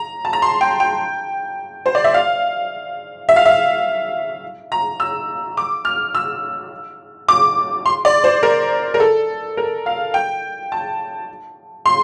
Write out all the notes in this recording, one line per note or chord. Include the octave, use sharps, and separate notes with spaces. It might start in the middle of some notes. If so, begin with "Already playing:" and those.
Already playing: A#5
A5
A#5
C6
G5
G5
C5
D5
E5
F5
E5
F5
E5
A#5
E6
D6
F6
E6
D6
C6
D5
C5
A#4
A#4
A4
A#4
F5
G5
A5
C6